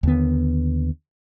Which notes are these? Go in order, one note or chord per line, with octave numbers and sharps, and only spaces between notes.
D#2 D3 B3